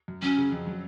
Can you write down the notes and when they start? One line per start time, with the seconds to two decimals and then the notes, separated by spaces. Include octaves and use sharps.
0.08 F#2
0.22 F#3 C#4
0.37 C#3
0.52 F2
0.67 F#3